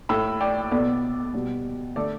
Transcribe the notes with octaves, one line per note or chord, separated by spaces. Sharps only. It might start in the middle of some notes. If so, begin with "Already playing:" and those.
A2 A3 B5 E6
D5 G5
B2 B3 A4 D5
B2 G3 B3
D3 A3 A4 D5